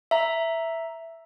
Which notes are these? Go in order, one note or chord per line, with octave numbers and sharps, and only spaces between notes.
E5 A#5